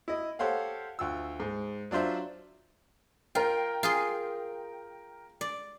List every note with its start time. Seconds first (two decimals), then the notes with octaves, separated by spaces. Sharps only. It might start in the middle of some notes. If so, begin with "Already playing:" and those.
0.08 E4 D#5
0.39 G4 A4 C5 C#5 F5 F#5
0.99 D2 F4 E6
1.40 G#2
1.91 F#3 D4 F4 C5 E5
3.35 F4 A#4 G5
3.83 F4 G#4 C6
5.41 D5